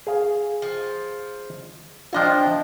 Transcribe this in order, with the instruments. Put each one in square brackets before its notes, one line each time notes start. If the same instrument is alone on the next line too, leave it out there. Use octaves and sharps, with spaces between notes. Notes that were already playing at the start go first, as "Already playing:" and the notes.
[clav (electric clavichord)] G#4 F5
[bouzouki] F3
[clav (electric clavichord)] F3 D4 F4 [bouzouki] E4 D#5 G5